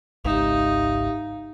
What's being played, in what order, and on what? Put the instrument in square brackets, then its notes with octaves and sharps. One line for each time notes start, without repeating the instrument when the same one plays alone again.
[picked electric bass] G#1 C#2 G#2 [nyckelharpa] D#4 [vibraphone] G4 E5 F5